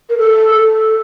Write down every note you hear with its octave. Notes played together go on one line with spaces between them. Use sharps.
A#4
A4
A4